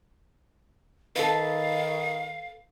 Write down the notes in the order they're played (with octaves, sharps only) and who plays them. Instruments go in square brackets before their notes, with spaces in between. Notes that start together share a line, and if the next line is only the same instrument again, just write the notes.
[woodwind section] D#3 [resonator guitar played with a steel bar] A4 B4 [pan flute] F5